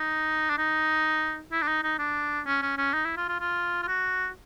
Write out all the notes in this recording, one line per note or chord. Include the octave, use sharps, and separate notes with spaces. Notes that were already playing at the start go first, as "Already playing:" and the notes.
Already playing: D#4
D4
D#4
E4
D4
D#4
D#4
D4
C#4
C#4
C#4
D#4
E4
F4
F4
F4
F4
F#4